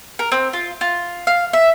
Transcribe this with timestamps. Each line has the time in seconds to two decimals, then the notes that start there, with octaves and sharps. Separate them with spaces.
0.19 A#4
0.32 C4
0.53 F4
0.81 F4
1.27 F5
1.53 E5